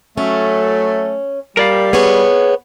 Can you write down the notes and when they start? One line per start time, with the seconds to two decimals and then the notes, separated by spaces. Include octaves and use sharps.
0.18 F#3 A3 C#4
1.57 G3 A#4 D5 F5
1.93 B3 G#4 C#5